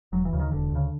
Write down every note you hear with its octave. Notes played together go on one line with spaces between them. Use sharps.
E1 F#3
E3
D2 C#3
D#3
E1 D3
D2 C#3